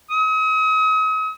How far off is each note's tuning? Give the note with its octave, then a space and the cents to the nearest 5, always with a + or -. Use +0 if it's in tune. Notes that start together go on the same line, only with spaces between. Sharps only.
D#6 +40